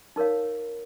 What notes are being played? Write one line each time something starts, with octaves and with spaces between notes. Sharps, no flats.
D#4 A#4 C#5 F5